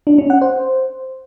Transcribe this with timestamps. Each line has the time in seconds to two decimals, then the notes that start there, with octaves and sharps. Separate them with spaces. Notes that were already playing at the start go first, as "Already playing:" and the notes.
0.07 D4
0.18 C#4
0.30 F#5
0.42 C5